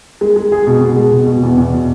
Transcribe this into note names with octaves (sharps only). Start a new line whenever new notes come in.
G#3
G#3
G#4
B2
B2
G#3
B2
B2
E2
E2
B2